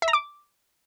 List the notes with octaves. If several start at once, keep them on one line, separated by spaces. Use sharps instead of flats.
E5
A#5
D6